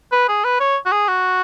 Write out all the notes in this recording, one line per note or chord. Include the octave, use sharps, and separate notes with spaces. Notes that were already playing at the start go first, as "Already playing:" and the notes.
B4
G#4
B4
C#5
F#4
G#4
F#4